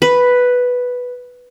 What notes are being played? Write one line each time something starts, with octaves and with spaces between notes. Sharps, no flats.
B4